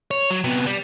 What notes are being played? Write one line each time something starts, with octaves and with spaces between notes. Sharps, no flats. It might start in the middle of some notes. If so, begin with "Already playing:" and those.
C#5
F#3
C3 B3
G3